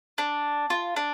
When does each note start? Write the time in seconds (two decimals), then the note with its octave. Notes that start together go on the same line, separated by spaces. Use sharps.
0.18 D4
0.70 F4
0.96 D4